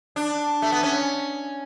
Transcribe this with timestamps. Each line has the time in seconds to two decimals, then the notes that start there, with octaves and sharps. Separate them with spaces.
0.16 D4
0.62 A3
0.72 B3
0.83 C#4